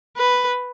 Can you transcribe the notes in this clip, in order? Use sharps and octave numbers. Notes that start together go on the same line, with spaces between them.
B4